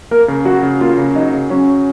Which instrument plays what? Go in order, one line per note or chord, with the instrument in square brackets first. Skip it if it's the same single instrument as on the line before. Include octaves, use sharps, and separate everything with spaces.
[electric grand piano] A#3 [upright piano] A#4
[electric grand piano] C#3
[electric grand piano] F#3 [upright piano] F#4
[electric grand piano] C#3
[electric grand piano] A#3 [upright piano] F4
[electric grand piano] C#3
[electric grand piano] F#3 [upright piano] D#4
[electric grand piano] C#3
[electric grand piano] F#3 [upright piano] C#4